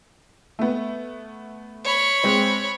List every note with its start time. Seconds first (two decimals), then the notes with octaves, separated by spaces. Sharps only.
0.59 A3 B3
1.84 C#5 B5
2.24 G#3 C4